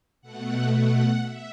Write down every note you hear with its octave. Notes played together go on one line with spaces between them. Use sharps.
B2 A3 F#5
F#5
E5